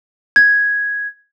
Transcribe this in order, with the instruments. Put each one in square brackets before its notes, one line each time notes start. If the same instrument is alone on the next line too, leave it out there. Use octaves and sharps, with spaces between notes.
[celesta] G#6